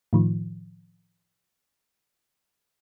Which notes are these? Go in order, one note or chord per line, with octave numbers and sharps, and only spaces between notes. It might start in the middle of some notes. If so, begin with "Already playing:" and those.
A2 D#3 F3